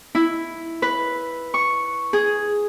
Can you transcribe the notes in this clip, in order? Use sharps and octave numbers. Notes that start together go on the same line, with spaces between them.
E4
B4
C#6
G#4